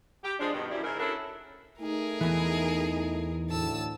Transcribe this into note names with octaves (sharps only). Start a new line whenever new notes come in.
G4
F3 G#3 D4
G2 B2 D#3
F#2 G3 E4
G#2 C#3 E4 A#4
C#4 D4 E4 F#4 A4 A#4
A3 D#4 G#4 A#4
E2 E3
D2 A2 A5 E6